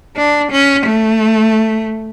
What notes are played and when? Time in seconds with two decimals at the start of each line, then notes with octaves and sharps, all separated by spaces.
0.17 D4
0.52 C#4
0.86 A3